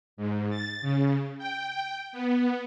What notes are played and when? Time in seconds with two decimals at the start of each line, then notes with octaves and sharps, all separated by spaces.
0.17 G#2
0.50 A6
0.81 C#3
1.38 G5
2.12 B3